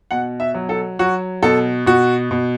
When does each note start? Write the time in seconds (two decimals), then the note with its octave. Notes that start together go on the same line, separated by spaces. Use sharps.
0.11 B2 F#5
0.40 E5
0.54 F#3
0.69 A4
0.99 F#3 F#4
1.42 B2 A4
1.86 B2 F#4
2.31 B2